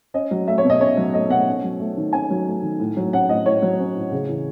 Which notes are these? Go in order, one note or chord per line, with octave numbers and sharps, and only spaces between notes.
C#4 D#5
F#3
A3 E5
C#5
B2
D#5
C#4 C#5
F#3
A3 D#5
B2 F#5
C#4
F#3
A3
D#3
C#4 G#5
F#3
A3
D#3
A2
F#3
C#4 F#5
A2 D#5
A2 C#5
F#3
C#4
A2
C#3
E3